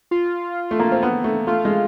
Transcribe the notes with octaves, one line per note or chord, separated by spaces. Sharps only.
F4
A3
A#3
C4
B3
A3
A3 F4
G#3